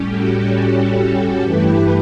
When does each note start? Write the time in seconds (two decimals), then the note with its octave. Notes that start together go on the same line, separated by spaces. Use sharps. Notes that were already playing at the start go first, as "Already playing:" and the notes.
Already playing: A2 G3 C#4 G4
0.08 F#4 A4
0.53 F#4 A4
0.98 G4
1.43 G2 E3 A3 E4 G4 B4